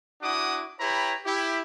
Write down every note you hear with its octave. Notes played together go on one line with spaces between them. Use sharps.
D4 E4 F#4 F#5 D6 D#6
E4 G4 B4 C#5 A#5 B5
E4 G4